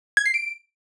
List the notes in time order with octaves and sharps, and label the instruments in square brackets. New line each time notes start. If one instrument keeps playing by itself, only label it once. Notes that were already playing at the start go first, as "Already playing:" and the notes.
[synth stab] G#6
C7
D7